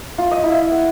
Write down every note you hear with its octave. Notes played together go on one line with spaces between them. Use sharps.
F4
D#5
E4
F#5